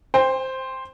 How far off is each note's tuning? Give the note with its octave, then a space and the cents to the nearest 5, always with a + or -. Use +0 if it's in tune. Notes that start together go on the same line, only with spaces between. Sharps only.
C5 +0 G5 +25